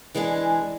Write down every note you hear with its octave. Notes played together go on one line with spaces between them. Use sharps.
E3 G#3 D4 G#4